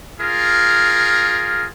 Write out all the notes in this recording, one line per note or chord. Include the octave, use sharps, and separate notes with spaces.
F4 G#4 A#4